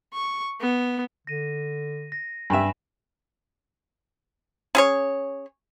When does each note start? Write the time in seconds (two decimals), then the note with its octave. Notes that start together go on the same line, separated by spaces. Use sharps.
0.14 C#6
0.61 B3
1.27 D3 A#6 D#7
2.12 A#6
2.50 G2 G4 E5 G#5 B5 E7
4.75 C#4 G#4 C#5